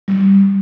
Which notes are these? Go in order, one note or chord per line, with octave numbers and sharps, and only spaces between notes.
G3